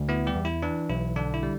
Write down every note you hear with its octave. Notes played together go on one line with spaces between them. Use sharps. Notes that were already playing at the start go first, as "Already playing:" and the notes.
Already playing: D2
B3 E4
G3 G4
E2
E4
E3 D4
B1 E4
D3 D4
E4
G3